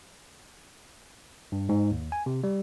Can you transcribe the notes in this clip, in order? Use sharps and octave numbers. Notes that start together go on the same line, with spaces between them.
G2
G#2
D#2
G#5
C3
G3